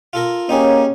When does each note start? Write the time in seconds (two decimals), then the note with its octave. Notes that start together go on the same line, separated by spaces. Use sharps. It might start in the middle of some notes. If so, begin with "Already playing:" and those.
0.13 F4 A4 A#4
0.49 A#3 C#4 D#4 G4 G#4